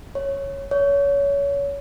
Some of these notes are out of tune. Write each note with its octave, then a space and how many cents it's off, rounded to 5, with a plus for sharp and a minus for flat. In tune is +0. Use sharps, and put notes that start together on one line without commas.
C#5 -5
C#5 +25